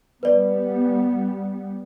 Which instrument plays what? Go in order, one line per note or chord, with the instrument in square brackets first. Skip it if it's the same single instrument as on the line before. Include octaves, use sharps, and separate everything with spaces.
[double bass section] G3 B3 [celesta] B4 D5